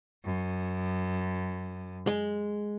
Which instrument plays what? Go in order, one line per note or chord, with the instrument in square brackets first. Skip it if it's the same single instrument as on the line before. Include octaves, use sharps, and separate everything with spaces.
[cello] F#2
[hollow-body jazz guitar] G#3